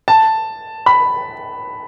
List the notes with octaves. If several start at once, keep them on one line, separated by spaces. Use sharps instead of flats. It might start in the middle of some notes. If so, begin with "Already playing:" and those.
A5
B5